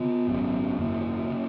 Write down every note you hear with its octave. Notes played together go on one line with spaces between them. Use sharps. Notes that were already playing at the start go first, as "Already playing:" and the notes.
Already playing: C#3 B3
G#1 F#2 C#3
G#1 F#2 C#3 A#3
C#3